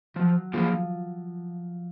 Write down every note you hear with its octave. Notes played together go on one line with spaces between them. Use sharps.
F3 F#3
F3 A#3 F4 G#4